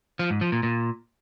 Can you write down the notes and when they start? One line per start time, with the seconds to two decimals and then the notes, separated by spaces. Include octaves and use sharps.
0.19 F3
0.30 G#2
0.41 F3
0.52 A#2
0.63 A#2